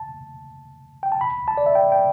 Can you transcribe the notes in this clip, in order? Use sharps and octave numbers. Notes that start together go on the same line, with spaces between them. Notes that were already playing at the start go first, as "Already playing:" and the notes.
Already playing: A5
G5
A5
B5
A5
D5
E5
G5
G5